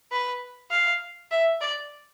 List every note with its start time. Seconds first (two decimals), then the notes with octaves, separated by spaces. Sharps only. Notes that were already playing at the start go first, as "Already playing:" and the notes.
0.12 B4
0.71 F5
1.31 E5
1.61 D5